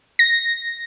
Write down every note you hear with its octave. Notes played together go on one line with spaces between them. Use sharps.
A#6